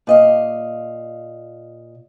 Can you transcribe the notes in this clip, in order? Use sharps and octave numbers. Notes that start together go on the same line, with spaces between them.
A#2 D#5 F5